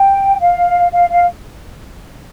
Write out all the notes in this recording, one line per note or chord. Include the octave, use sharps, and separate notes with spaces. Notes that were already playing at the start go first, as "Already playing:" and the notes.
Already playing: G5
F5
F5
F5